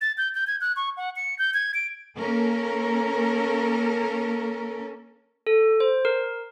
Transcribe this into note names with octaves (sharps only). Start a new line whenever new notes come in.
A6
G6
G6
G#6
F#6
C#6
F#5
C#7
G6
G#6
D7
A#3 C#4 A4 A#4
A4
C5
A#4